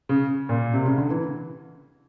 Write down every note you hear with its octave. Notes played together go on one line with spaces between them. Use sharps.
C#3
A#2
C3
C#3
D3
E3